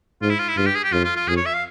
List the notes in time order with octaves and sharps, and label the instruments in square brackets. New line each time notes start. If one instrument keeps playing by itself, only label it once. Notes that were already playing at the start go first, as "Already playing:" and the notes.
[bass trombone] G#2 [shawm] F4
[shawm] E4
F4
E4
[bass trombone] G2 [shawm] F4
[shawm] G4
G#4
G4
[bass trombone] F2 [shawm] F4
[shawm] F4
F4
[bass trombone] F2 [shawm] G#4
[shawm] C#5
E5
F5